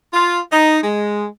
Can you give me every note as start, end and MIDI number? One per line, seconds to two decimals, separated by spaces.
0.13 0.39 65
0.51 0.77 63
0.83 1.25 56